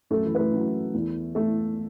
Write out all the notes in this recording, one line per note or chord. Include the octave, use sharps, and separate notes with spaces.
F#2 F#3 A3 A4
E3 E4
B4
A3 A4
F#2 F#3
E2 E3
A3 A4